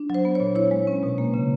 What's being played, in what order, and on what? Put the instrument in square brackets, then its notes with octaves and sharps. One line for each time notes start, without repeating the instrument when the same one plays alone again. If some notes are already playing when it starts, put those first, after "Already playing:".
Already playing: [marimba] D4
F#3 C5
B3
C#5
A#2
E4 C#5
G#3
C#4
B2
A#3
C#3